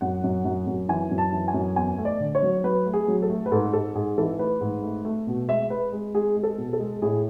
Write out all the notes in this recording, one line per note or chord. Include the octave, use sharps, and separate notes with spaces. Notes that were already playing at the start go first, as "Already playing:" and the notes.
F#2 F#5
F#2
F#2
F#2
E3 G#5
F#2
A5
E3
G#5
F#2
E2 G#5
A3
D5
D3
C#5
F#3
F#3 B4
A3
G#4
F#3
A4
A3
B4
G#2 A4
G#2 A4
G#2 G#4
E3 A4
A3 B4
G#2
A3
A3
B2
G#3 E5
G#3 B4
G#3
G#3 G#4
G#3
A4
B2
A4
G#3
A2 G#4